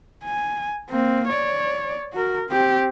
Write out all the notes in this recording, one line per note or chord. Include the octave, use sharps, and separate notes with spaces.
G#5
A#3 C4
C#5 D5
F#4 A#4
C4 G4